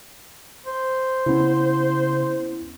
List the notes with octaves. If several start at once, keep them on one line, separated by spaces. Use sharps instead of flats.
C5
C#3 B3 C#4 E4